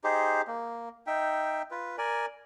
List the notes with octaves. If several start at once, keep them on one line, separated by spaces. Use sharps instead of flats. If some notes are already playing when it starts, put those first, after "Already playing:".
D#4 G4 G#4 C5
A#3
D#4 E5 G5
F4 B4
A#4 D5 G#5